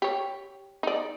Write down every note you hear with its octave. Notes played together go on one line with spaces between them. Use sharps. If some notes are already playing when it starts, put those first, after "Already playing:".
G4 C#5
D#4 D5